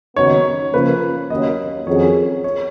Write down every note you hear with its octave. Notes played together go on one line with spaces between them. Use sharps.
D#2 C#3 F#3 B3 D#4 C#5
C#3 F3 A#3 B4
D#2 D#3 F#3 A#3 C#4 D#5
F2 D#3 F#3 C#4 G#4 C#5
C#5